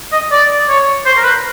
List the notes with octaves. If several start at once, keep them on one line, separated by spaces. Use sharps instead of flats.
D#5
D5
C#5
C5
A#4
B4